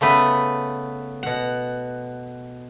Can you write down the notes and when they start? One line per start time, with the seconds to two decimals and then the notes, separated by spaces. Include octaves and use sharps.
0.01 C#3 A3 B3 B4
1.23 B2 F#5